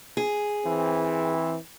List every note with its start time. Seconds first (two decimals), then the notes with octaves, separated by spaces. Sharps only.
0.17 G#4
0.66 E3 C4